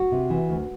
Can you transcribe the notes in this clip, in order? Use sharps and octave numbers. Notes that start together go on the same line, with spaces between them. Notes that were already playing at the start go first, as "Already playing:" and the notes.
Already playing: F#4
C3
E3
D2